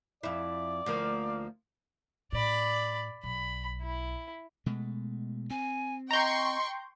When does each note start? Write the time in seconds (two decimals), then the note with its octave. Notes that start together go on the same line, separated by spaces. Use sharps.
0.23 F2 E4 D5
0.86 D2 F3 A#3
2.32 A2 D5 B5
3.24 B1 B5
3.81 E4
4.66 B2 G#3 A3
5.50 C4 G#5
6.11 D#5 G5 A#5 C6 C#6 G6